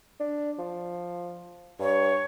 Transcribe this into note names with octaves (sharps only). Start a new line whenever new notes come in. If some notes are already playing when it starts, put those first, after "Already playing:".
D4
F3
G2 C#5